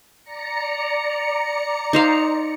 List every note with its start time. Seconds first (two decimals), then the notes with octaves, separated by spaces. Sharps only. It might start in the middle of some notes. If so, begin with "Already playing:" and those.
0.23 D5 A#5 C#7
1.93 D#4 C5 F5